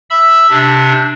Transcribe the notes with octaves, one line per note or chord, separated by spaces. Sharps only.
E5 B5 E6
C3 D4